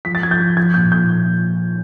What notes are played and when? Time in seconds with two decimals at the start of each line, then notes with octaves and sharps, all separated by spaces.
0.05 F3 B6
0.15 A6
0.23 F3 G#6
0.31 G6
0.39 F3
0.57 F3 G#6
0.74 A#2 G6
0.91 A#2 G6